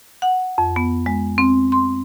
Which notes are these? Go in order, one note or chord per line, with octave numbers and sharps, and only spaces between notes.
F#5
F2
B3
G#3
C4
C6